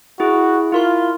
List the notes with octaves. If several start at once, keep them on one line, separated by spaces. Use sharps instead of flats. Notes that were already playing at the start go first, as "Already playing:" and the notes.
E4 F#4 G#4
E4 F4 A#4 C6